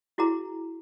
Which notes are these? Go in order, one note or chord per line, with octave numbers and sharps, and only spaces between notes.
E4 F#4 G#4 A#5